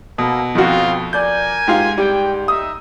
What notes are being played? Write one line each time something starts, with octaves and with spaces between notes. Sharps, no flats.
B2 A#3 A4
F2 C4 F4 F#4
A#4 D5 G#5 G6
G#2 F4 G4
G3 G5
D#4 E5 D#6